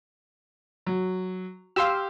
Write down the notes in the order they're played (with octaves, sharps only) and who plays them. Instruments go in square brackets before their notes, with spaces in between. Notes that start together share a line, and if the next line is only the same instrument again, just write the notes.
[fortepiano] F#3
[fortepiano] G4 C6 [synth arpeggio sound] F5 E6